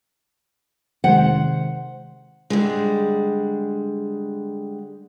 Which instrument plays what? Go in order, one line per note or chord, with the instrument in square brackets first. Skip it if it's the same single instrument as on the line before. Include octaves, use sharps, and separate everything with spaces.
[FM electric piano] C3 D#3 G#3 [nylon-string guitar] C5 F#5
[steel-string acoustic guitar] D3 G3 G#3